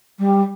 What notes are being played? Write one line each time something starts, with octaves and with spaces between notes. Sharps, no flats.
G3